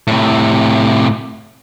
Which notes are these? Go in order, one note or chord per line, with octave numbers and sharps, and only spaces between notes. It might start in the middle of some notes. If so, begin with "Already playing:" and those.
A2 C3